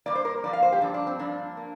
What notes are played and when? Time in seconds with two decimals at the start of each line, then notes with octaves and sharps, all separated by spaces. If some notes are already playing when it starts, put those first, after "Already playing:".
0.06 G2 F3 A#3 D5
0.15 C5
0.25 A#4
0.44 G2 F3 A#3 D5
0.53 F5
0.63 C5
0.72 G4
0.81 G2 F3 A#3 D4
0.94 D4
1.07 C4
1.19 G2 F3 A#3 D4
1.57 A#3